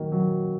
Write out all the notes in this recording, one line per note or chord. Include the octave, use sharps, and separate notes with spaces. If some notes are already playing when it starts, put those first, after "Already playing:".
Already playing: D#3 F#3 A#3
F#3